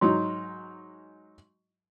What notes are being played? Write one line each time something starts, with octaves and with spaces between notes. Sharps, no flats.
G#2 F#3 D#4 C6